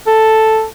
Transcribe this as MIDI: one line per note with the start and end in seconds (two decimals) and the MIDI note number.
0.07 0.65 69